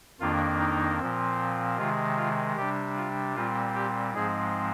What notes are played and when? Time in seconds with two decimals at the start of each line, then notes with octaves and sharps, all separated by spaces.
0.20 F2 D#3 A#3 D4 F4
0.59 D#4
0.98 A#2 F3 C4
1.78 C3 D#3 G#3 F4
2.17 F4
2.56 C3 G3 D4 G4
2.97 F4
3.35 A#2 G3 C4 F4
3.75 G4
4.14 G#2 F3 G#3 C4 G#4